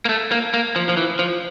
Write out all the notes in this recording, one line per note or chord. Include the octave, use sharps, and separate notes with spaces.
A#3
A3
A#3
A#3
F3
F3
E3
F3